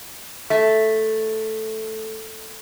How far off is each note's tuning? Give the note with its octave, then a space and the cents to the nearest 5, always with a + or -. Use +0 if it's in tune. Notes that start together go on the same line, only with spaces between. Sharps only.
A3 +0 E5 +0